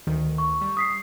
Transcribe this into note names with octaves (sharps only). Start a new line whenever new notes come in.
D2 D#3
C#6
G3
D#6 B6 C7